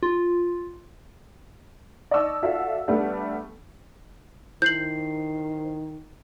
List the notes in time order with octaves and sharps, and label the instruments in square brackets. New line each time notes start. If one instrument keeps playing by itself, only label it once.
[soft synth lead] F4
[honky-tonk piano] D5 D#5 A5 C#6 E6
F4 F#4 A4 D5 E5 F5
G3 A3 B3 D4 A4
[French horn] D#3 [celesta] E4 C7 [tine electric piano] C5 [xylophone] G6 F#7